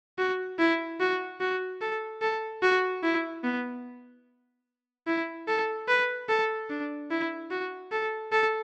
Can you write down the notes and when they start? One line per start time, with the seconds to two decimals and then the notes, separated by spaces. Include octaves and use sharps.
0.18 F#4
0.59 E4
1.00 F#4
1.41 F#4
1.81 A4
2.22 A4
2.62 F#4
3.03 E4
3.44 B3
5.07 E4
5.48 A4
5.88 B4
6.29 A4
6.70 D4
7.11 E4
7.51 F#4
7.92 A4
8.32 A4